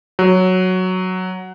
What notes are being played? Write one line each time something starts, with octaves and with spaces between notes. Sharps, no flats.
F#3